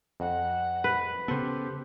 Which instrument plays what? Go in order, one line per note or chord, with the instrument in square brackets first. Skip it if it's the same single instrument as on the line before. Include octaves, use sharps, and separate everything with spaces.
[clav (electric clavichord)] F2 [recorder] F#5
[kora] B4
[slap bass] C#3 B3 [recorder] G4 [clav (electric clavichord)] A4 C5